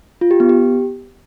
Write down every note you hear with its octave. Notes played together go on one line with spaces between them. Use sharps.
F4
G4
B3
G4